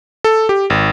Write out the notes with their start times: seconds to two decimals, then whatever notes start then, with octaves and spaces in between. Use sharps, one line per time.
0.24 A4
0.49 G4
0.70 G#1